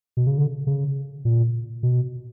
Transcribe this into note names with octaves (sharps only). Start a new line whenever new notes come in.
B2
C#3
D3
C#3
A#2
B2